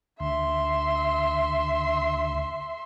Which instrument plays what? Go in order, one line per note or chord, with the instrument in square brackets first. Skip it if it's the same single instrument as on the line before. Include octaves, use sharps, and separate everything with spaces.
[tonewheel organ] D2 [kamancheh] E5 C6